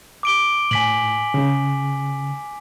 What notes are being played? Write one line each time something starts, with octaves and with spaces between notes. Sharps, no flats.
D6 D7 G7
A2 G#5 B6 F#7
C#3